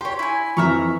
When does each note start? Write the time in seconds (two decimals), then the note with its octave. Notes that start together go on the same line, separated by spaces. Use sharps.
0.01 G4 C#5 C6
0.19 E4 G#5
0.57 F2 E3 E5 A#5 C#6 F6